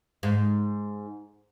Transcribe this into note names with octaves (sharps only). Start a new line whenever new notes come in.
G#2